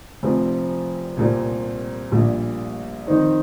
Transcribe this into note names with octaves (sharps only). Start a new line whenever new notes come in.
F1 F2 C3 F3 C4
C2 A#2 G3 C4
A#1 A#2 G3
F2 D#3 C4 D#4